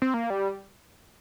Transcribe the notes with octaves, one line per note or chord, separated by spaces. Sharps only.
C4
A#3
G3